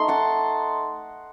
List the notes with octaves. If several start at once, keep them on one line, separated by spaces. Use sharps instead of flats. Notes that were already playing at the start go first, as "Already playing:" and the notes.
Already playing: A3 D#4 C6
F#5 A5